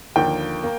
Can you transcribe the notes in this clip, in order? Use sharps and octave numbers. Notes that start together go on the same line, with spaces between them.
D#2 D3 F3 A#3 G5
A#3